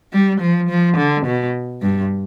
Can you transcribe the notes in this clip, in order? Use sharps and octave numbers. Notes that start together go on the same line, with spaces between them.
G3
F3
F3
D3
B2
G2